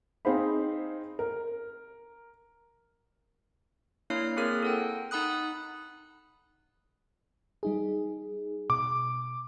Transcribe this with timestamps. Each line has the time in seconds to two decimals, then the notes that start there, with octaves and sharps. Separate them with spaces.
0.25 C4 D#4 G#4 C5 F5 B5
1.19 A#4
4.10 A#3 D4 E4 C#5 F6 C7
4.37 A#3 C4 G#4 A#4 F6
4.63 A4 F#5 G5
5.11 D#4 F#5 B5 D#6 F#6
7.63 G3 D#4 G#4
8.70 B2 D6